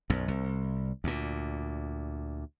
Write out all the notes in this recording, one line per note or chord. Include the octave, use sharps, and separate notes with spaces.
B1 F#2
C2
D2 A#2